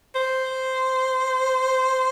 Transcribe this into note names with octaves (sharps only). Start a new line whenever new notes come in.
C5